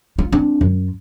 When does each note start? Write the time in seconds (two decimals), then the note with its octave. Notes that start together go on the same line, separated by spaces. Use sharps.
0.19 F4
0.32 C4 D4
0.61 F#2